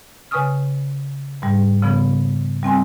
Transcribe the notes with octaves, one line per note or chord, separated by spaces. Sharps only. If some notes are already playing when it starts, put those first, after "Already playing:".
C#3 B4 G#5 C#6 D#6 F6
G#2 G3
C#3 F3 B3
G3 C4 G#5 C6